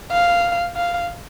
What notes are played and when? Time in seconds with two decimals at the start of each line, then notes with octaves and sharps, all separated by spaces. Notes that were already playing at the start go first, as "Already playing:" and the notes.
0.12 F5
0.76 F5